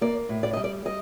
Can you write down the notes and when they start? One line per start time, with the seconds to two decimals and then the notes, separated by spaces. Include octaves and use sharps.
0.01 A#3 D5
0.29 A2
0.43 D5
0.53 G3 D#5
0.64 D5
0.85 G3 D#5